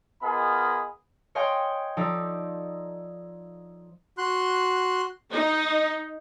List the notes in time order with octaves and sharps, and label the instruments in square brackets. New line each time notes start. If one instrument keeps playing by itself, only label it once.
[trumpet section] B3 F4 G#4 A#4 D#5 B5
[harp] C#5 D#5 F5 G5 G#5 C6
F3 D#4 A4 D5
[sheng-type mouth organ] F#4 C6 F#6
[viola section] D#4